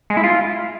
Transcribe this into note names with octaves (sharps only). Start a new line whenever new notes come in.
G#3
E4
F4